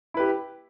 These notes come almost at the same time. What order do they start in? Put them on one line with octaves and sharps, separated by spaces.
E4 B4 G4